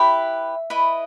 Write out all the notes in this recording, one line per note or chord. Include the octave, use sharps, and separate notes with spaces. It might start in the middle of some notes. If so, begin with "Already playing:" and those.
Already playing: E4 G4 B4 E5
E4 B4 D#5